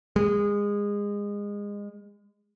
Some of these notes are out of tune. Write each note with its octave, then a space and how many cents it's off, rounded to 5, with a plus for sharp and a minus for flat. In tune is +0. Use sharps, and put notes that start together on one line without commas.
G#3 -25